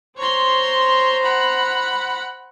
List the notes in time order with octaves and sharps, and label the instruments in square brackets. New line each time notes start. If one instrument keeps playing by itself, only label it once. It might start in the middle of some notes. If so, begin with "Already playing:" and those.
[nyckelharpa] C5 A#5 [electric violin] C#5 C6
[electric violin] F#5 B5